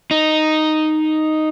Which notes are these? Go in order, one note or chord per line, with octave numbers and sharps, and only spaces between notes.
D#4